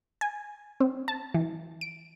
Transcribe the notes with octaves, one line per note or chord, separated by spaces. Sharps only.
G#5
C4
A5
E3
D7